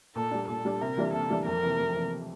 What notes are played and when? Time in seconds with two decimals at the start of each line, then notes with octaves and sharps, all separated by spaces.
0.16 A#2 A4
0.31 G3 D4
0.48 A#2 A4
0.65 G3 D4
0.81 C3 A#4
0.97 E3 G3 A#3 D4
1.13 C3 A4
1.30 E3 G3 A#3 D4
1.46 F2 A#4
1.63 C3 E3
1.79 F2
1.96 C3 E3